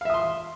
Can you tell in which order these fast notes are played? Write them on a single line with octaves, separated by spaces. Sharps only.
F5 E5 D#6 C6